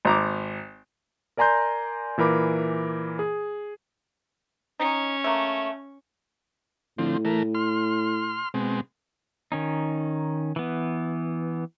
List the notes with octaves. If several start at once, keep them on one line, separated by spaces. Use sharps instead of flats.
G#1 A#5 D6
A#4 D5 G#5 A#5 C6 G6
A#2 E3 A#4 B5 D6
G#4
C#4 D#4
A3 A#3
A2 D3 F3 C4
E3 A3 A#4
C6 F6
B2 G#3 C4
D#3 C#4 D#4
E3 B3